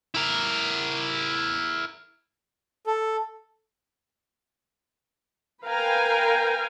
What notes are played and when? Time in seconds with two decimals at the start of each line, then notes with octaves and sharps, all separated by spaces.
0.15 E4 A#4
2.87 A4
5.65 A#4 B4 F5 G5 G#5 A#5